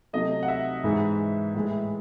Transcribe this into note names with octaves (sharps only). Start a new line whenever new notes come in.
C3 F#3 A3 D#5
F#5
E5
G#2 E3 G#3
A2 E3 G#3